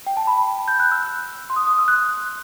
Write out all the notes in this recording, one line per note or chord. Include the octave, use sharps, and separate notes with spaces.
G5
A5
B5
G6
F#6
E6
C6
D#6
D#6
E6
F#6